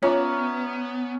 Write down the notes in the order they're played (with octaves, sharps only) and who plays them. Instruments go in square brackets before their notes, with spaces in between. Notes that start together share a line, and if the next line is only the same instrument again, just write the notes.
[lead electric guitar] B3 [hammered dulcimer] C#4 [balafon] F4 C#5 [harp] D5 E5 A#5